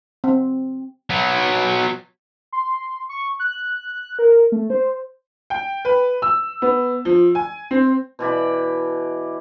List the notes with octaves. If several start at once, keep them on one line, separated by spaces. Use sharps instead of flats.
C4
F#3 B3
C6
C#6
F#6
A#4
A3
C5
G5
B4
E6
B3
F3
G#5
C4
B2 E3 D5 B5